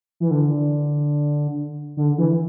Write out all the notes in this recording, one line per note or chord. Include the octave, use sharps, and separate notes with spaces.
E3
D3
D3
E3